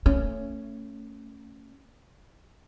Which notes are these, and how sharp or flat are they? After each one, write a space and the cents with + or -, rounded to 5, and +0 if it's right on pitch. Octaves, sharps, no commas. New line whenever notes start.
A3 +30 C#4 +0